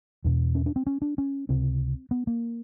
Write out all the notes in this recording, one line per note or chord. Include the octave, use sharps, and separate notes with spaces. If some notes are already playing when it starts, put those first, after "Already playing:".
E2 B2
C#4
D4
C4
C#4
D4
C#4
C#2 C3 C4
B3
A#3